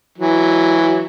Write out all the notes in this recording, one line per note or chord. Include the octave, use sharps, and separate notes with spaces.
E3 F#3